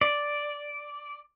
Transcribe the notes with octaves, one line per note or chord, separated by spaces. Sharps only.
D5